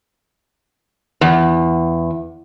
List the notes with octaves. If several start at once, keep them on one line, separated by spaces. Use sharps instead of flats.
E2